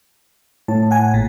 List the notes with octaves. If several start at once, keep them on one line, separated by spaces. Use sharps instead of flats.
A2 A5
F#5 G#5
G#1 A#2